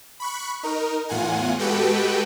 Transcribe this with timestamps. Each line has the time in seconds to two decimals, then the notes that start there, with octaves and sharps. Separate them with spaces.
0.20 B5 C#6 F#6
0.63 D#4 A#4
1.09 E2 A2 F4 F#5 G#5
1.59 G#3 F#4 G4 A4 B4 G5